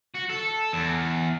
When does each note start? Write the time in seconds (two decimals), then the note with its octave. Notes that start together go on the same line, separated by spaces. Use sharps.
0.15 F#4
0.30 A4
0.73 E2